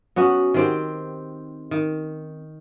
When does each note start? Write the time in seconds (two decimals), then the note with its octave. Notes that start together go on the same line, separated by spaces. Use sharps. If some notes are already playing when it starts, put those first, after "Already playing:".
0.16 B3 C#4 F#4
0.54 D#3 C4 G4
1.71 D#3